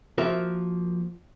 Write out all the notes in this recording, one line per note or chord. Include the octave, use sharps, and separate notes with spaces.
F3 A#3 F#4 A#4 E5